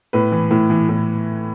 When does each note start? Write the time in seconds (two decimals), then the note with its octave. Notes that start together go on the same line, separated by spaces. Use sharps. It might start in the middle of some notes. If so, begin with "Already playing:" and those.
0.13 A2 B4
0.32 E3
0.51 A2
0.70 E3
0.89 A2